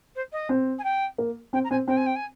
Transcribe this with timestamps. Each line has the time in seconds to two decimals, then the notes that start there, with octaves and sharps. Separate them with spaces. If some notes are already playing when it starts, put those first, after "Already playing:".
0.15 C5
0.32 D#5
0.49 C4
0.78 G#5
0.84 G5
1.18 A#3
1.53 C4 G5
1.64 A#5
1.70 C4 G#5
1.87 C4 G5
1.96 G#5
2.06 G5
2.15 G#5